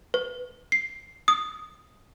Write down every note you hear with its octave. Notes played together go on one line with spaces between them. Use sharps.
B4
C7
D#6